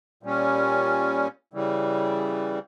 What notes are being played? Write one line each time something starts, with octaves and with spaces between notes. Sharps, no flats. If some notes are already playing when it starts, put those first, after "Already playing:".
A#2 G3 C#4
C#3 E3 G3